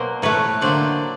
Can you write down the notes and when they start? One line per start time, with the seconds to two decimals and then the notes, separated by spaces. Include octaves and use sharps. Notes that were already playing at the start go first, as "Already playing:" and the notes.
Already playing: B2 F#3 A#3 A#4 C5
0.22 A2 E3 A3 B4 C#5
0.61 D3 F#3 A#3 C5 D5